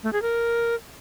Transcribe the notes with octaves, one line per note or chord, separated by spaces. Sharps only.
A3
G#4
A#4